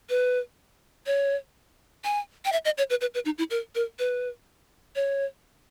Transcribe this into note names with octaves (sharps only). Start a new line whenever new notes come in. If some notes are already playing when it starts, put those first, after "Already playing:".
B4
C#5
G#5
G5
E5
D#5
C#5
B4
B4
B4
D#4
E4
A#4
A#4
B4
C#5